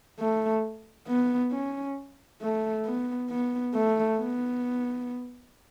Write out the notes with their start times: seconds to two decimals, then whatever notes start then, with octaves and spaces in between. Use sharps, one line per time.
0.20 A3
1.08 B3
1.52 C#4
2.42 A3
2.86 B3
3.30 B3
3.74 A3
4.18 B3